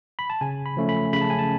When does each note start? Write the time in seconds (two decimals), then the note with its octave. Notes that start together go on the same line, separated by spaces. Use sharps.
0.19 B5
0.30 A5
0.41 C#3 G#5
0.66 B5
0.77 F3 A3 C#4
0.89 B5
1.13 C#3 B5
1.21 A5
1.30 G#5
1.39 A5